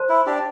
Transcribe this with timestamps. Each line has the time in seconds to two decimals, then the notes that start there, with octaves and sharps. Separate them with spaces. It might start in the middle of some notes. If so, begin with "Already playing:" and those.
Already playing: C5 A5 C6
0.09 E4
0.26 D4 G4